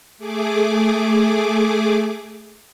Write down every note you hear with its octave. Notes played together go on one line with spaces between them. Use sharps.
A3 G#4 D6